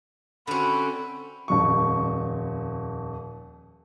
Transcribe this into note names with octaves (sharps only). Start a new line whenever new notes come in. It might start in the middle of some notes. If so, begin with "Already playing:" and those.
D3 C4 C#4 F#4 B5
D#1 F2 C#6